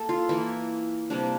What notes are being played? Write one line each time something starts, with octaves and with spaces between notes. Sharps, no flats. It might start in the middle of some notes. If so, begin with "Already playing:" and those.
Already playing: A#3 A4
F4
E3 A#3 E4
C3 G3 A#3 D4